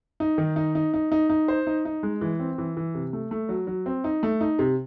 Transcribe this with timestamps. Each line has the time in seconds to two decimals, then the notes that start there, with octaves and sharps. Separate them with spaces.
0.20 D#4
0.38 D#3
0.56 D#4
0.75 D#4
0.94 D#4
1.12 D#4
1.30 D#4
1.48 C5
1.67 D#4
1.85 D#4
2.03 G#3
2.21 E3
2.40 C4
2.58 E3
2.77 E3
2.95 C3
3.13 A3
3.31 A3
3.49 F#3
3.67 F#3
3.86 C4
4.04 D#4
4.23 A3
4.41 D#4
4.59 C3